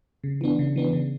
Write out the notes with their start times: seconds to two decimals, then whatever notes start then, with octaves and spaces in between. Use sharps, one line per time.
0.24 C#3
0.41 E3 B3 D4
0.59 C#3
0.76 E3 B3 D4
0.93 C#3